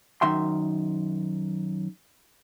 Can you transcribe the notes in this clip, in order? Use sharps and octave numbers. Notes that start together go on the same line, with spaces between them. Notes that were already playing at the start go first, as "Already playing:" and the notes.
F#2 D#3 E5 C6